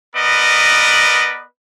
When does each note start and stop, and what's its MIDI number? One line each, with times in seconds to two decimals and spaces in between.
0.16 1.45 59
0.16 1.45 70
0.16 1.45 71
0.16 1.45 74
0.16 1.45 75